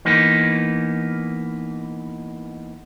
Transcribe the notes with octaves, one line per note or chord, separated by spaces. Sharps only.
E3 A#3 B3 D#4